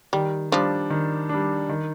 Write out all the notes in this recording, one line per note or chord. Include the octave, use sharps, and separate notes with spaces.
D#3 G3
F3 G3 D4
D#3
G3 D4
D#3